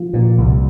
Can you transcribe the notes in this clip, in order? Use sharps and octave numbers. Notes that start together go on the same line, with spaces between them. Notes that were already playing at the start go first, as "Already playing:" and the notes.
Already playing: F3
A#2
C2